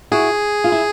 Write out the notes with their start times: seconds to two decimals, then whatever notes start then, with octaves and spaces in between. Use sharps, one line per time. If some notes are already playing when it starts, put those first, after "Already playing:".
0.12 E4 F#4 G#4
0.64 F4
0.72 E4